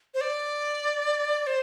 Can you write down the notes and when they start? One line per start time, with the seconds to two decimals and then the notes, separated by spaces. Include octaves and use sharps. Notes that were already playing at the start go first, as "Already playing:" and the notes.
0.14 C5
0.21 D5
1.47 C5